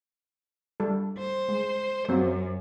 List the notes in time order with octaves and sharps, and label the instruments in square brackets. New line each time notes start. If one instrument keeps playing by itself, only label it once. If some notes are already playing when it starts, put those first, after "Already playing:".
[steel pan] G3 A4
[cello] C5
[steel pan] G#3
[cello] F#2 [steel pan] F#3 C4